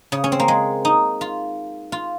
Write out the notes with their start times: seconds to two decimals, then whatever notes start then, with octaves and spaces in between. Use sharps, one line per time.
0.12 C#3
0.24 C#4
0.32 C4
0.40 A#3
0.48 G#3
0.85 D#4
1.21 F4
1.92 F4